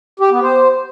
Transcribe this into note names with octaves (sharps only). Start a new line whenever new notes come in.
G4
B3
C5